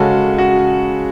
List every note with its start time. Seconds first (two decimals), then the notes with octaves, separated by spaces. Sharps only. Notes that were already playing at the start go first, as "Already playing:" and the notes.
Already playing: C#3 G#3 C#4 F#4 A4
0.38 F#4